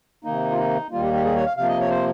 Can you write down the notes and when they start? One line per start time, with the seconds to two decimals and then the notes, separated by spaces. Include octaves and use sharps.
0.24 C3 D#3 A#3 D#4
0.51 F4
0.58 D#4
0.91 D#2 D#3 G3 A#3 F4
1.02 G4
1.13 G4
1.24 G#4
1.35 C#5
1.46 F5
1.57 C3 F3 A#3 F5
1.68 D#5
1.80 C#5
1.90 C5